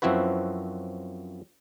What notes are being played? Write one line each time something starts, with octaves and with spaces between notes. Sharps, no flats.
F#2 F3 C4 E4 F#4 B4